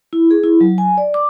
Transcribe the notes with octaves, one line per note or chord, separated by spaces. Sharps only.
E4
G#4
E4
F#3
G#5
D5
D6